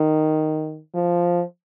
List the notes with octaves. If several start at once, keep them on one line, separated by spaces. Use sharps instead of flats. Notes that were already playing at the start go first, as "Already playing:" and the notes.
Already playing: D#3
F3